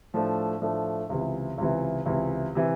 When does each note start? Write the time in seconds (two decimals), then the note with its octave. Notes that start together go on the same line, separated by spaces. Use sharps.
0.14 A2 F3 A3 D4
0.61 A2 F3 A3 D4
1.10 C#2 C3 E3
1.58 C#2 C3 E3
2.06 C#2 C3 E3
2.55 C3 E3